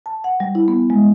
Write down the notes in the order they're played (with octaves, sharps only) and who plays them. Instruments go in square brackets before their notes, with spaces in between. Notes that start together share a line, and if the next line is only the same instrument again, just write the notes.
[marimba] A5
F#5
G3
E4
B3
G#3